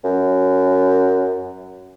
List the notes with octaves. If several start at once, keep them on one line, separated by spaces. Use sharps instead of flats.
F#2